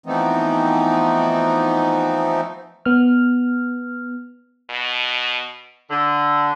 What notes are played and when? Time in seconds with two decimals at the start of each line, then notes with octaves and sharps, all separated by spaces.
0.06 E3 F3 A3 B3 C4 D#4
2.85 B3 F6
4.70 B2
5.90 D3